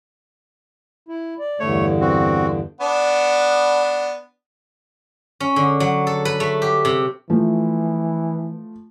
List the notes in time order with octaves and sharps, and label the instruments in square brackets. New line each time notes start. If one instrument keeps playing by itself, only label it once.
[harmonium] E4
D5
[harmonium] E2 G2 D3 [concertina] A3 C#5
[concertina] C4 F#4
[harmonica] B3 D4
[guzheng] C#4
D3
F#3
A4
B4
A3
G4
C3
[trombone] E3 [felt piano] F3 A3